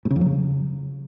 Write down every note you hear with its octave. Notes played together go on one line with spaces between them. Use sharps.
A2
C#3
F2
F#3
C#3